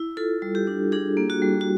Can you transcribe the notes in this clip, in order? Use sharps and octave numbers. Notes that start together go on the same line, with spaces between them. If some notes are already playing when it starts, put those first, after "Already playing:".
Already playing: E4
F4 A4
G3
G4
D4
D4 G#4
A#3
F#4
G3
F#4